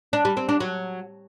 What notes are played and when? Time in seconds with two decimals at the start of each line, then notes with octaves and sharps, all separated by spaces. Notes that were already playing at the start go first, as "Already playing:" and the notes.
0.13 D4
0.25 G3
0.37 C4
0.49 D4
0.60 F#3